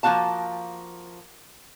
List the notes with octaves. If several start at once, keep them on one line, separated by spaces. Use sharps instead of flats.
F3 A#3 F4 F#4 F5 A5